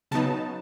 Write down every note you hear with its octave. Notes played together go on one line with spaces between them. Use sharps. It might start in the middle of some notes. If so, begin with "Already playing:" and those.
C#3 F#3 B3 D#4 A5